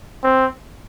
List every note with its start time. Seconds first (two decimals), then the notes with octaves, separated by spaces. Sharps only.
0.23 C4